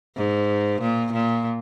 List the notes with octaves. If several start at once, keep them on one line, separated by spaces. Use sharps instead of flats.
G#2
A#2
A#2